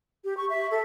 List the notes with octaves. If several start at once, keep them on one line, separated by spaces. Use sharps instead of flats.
G4
C#6
E5
A4